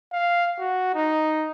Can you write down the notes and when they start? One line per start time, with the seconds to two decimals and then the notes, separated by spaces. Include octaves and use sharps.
0.13 F5
0.59 F#4
0.95 D#4